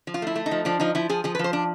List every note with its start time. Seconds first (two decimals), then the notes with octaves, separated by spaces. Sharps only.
0.07 F3
0.14 F4
0.22 A3
0.27 E4
0.36 A3
0.46 D#4
0.51 F3
0.65 F3 D4
0.80 F3 D#4
0.95 F3 E4
1.09 F3 G#4
1.24 F3 G#4
1.35 B4
1.39 F3
1.44 C5
1.53 D4